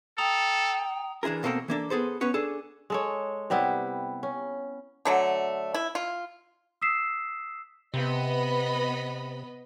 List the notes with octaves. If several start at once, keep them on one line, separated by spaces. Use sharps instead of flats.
A4 G5 A#5 D#6 F7
E3 D4 E4 G#4 A#4
B2 A#3 C4 A4 A#4
E3 A#3 D4 A4
B3 G#4 A4 C5
B3 C#4 B4 C#5
D4 G#4 A4
G#3 A4 C#5
C3 G3 B3 E4
C#4
D3 F#3 A3
E4
F4
D#6 E6 B6 C7 E7
C3 B3 D#5 B5